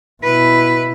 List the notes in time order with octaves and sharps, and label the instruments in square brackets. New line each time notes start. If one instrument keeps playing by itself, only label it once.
[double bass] B2 E4 [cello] B4